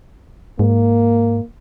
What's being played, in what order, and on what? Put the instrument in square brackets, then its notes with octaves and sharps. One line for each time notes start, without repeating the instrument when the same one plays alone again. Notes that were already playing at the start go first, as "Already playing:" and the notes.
[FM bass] G#2 [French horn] A#3